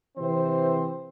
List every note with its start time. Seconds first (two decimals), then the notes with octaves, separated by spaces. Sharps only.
0.18 C3 E3 C4 C5